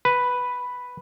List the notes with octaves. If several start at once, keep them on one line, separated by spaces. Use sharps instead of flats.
B4